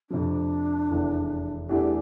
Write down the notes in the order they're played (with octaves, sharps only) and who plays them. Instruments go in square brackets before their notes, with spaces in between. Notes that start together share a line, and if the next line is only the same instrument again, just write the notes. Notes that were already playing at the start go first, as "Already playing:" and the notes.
[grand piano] F2 C3 F3 [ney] D4
[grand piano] F1 E2 E3
[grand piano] E2 E3 A3 D4 [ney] G4